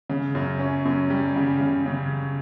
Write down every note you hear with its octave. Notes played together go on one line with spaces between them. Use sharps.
C#3
F#2
C#4
F#2
G3
C#3
C#3
C#3